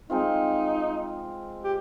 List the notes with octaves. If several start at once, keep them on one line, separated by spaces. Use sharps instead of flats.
G#3 C4 D#4 F4
G4